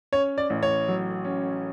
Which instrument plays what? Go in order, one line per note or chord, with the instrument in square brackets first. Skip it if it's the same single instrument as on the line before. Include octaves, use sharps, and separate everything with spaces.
[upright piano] C#4 [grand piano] C#5
[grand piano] D5
[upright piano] A1
[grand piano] C#5
[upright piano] F#3
C#4